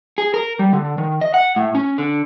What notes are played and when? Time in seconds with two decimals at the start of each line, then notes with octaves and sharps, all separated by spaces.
0.18 G#4
0.34 A#4
0.59 G3
0.73 D3
0.98 D#3
1.21 D#5
1.34 F#5
1.56 A2
1.75 C#4
1.98 D3